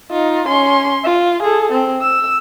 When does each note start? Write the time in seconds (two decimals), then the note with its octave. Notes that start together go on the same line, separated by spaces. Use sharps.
0.11 D#4 F4
0.47 C#4 C6
1.05 F4
1.43 G#4 A4
1.73 C4
2.01 E6